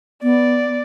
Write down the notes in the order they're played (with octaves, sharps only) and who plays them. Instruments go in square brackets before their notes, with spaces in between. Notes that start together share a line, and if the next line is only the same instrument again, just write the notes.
[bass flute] B3 [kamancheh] D5